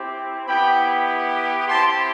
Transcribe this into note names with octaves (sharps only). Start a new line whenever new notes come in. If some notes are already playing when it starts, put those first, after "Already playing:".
Already playing: C4 E4 G4
B3 E4 G4 G5 B5
C4 E4 G4 A5 C6